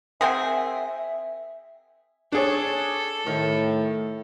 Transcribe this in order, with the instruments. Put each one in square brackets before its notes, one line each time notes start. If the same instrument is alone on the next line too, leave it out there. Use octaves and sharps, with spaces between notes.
[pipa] C4 G#4 [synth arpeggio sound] A#4 F#5 G5 [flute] E5
[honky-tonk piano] D4 G#4 C#5 [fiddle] A4
[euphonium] A2 [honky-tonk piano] D#3